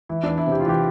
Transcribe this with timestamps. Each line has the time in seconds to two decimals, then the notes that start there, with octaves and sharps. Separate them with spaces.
0.09 E3 E4
0.23 E2 D4
0.37 E4
0.47 C3 G4
0.60 F4
0.66 E3 G4